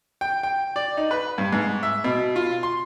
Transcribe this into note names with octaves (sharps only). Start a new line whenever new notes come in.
G5
G5
D5
D#4
B4
G2
G#2
E5
B2
F4
C6